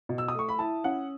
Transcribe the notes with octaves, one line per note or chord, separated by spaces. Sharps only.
B2
E6
D#6
A3 C#6
B5
E4 A5
C#4 F#5